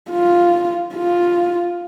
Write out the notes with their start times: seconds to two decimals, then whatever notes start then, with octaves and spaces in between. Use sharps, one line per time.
0.10 F4
0.95 F4